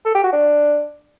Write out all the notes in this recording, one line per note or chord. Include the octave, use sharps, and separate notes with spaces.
A4
G4
F#4
D4